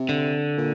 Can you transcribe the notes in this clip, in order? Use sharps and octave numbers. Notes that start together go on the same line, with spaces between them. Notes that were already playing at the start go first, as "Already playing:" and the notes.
Already playing: C3
D3
A#2